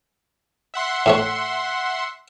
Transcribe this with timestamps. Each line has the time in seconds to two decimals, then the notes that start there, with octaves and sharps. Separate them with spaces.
0.74 E5 F#5 C6
1.06 A2 A3 C#5